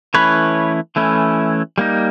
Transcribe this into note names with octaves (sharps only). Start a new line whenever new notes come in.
E3 A3 C#4 E4 B4 C#5
E3 A3 C#4 E4
G3 A#3 D#4